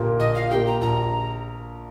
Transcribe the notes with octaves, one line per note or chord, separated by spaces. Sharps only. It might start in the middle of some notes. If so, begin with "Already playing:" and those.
Already playing: A#1 A#2 A#3 G4
A#1 D#5
F5
A#2 A#3 G4 G5
A#5
A#1 A#5